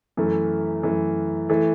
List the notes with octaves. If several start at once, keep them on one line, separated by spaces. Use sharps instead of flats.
F#2 E3 A3
F#2 E3 A3
E3 A3